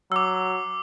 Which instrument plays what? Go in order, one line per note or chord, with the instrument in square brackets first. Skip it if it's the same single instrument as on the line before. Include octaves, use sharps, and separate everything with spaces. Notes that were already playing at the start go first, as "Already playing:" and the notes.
[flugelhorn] F#3 [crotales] D6 E6